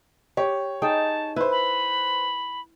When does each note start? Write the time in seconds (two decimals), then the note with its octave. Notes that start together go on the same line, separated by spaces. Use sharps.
0.37 G4 C#5
0.82 D#4 G#4 G5 A5
1.36 E4 B4 C5
1.51 B5